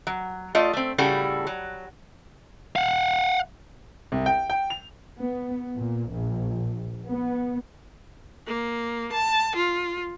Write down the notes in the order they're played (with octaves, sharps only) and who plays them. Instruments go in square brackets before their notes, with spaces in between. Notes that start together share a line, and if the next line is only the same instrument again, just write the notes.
[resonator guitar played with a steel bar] F#3
A3 F4 D5 D#5
A3 C4
A2 C#3 G3 F#4 A4
F#3
[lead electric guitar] F5 F#5
[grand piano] C2
G5
G5
F7
[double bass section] B3
A#2
A#1
B3
[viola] A#3
A5
F4